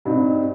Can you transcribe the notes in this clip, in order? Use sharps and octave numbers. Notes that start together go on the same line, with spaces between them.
G2 G3 C4 D#4